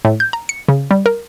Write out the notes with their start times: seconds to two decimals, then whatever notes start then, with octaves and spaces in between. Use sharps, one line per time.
0.05 A2
0.20 G6
0.33 A#5
0.49 C#7
0.69 C#3
0.91 G3
1.06 A#4